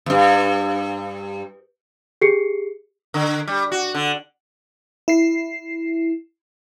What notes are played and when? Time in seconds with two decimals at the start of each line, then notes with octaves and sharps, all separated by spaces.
0.06 E2 G2
2.22 G4 G#4 C7 C#7
3.14 D3
3.47 G3
3.72 F#4
3.95 D3
5.08 E4 C7